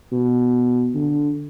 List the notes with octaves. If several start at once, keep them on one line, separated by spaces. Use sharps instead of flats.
B2
D3